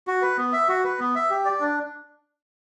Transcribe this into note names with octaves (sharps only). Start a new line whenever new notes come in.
F#4
B4
B3
E5
F#4
B4
B3
E5
G4
D5
D4